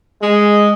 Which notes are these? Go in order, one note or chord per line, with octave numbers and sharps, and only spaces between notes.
G#3